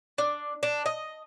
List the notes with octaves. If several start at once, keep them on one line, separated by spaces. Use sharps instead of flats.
D4
D4
D#5